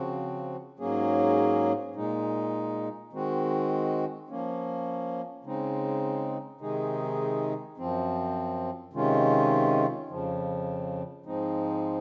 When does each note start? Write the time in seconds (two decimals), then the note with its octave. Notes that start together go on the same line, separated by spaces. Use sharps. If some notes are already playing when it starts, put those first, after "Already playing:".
Already playing: C#3 F3 C4 F#4
0.79 G#2 F#3 A#3 C#4 G#4
1.95 A#2 G#3 D#4
3.13 D#3 G#3 C4 F#4
4.29 F3 A#3 C#4
5.44 C#3 G#3 C4 D#4
6.61 C3 D#3 G#3 D#4 G#4
7.77 F#2 F3 C4
8.93 C3 D#3 G#3 C#4 F4
10.09 F2 C#3 F3
11.26 G#2 F3 G#3 C4 D#4